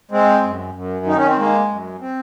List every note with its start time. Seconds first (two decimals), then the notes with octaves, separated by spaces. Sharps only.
0.11 G#3 C4
0.43 F#2
0.75 F#2
1.06 D#3 D#4
1.17 C#4
1.27 C4
1.37 G#3 A#3
1.69 F#2
2.00 C4